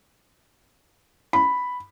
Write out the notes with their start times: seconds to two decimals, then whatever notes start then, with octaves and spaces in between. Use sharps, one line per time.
1.33 B5